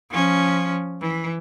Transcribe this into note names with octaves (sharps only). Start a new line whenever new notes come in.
F3 C#4
E3